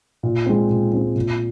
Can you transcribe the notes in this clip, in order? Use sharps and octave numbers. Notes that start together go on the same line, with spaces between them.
A#2
G#3 C4
A#2
G#3 C4
A#2